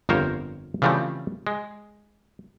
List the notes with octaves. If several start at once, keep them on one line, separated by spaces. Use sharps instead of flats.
G1 F2 A#4 C5 C#5
C#3 E3 F3 G3 A3 C4
G#3